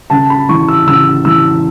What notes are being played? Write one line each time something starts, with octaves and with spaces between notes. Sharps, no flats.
C#3 A5
B5
E3 C#6
E6
C#3 E6
E3 E6